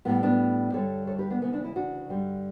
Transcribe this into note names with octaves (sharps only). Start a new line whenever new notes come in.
A2 G3 B3
B3 D4
G2 D3 G3 A4 C#5
A4 C#5
G4 B4
B3 D4
D2 C#3 E3 B3
B3 D4
C#4 E4
D4 F#4
G2 D3 G3